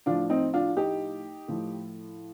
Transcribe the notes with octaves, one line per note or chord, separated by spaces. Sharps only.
A2 F3 D4 F4
C4 D#4
D4 F4
D#4 G4
A2 F3